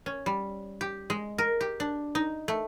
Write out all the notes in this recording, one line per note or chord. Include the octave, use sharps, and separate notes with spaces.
C#4
G3
G4
G#3
A#4
G4
D4
D#4
A3